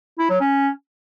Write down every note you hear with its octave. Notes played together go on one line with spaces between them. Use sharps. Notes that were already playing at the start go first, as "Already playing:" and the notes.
E4
F#3
C#4